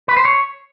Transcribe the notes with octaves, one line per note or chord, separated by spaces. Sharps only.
B4
C5
C#5